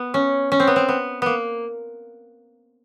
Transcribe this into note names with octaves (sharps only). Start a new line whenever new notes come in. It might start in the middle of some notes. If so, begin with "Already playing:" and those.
Already playing: B3
C#4
C#4
C4
B3
C4
B3
A#3 B3